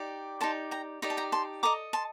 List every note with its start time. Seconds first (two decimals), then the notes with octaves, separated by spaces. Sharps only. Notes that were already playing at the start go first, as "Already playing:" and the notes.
Already playing: D#4 G4 D5
0.41 D#4 G4 D5 A5 C6
0.71 G5 A#5
1.02 D#4 G4 D5 A#5
1.10 A5
1.17 G5 A#5
1.32 A5 C6
1.63 A4 D#5 A#5 D6
1.93 A5 C6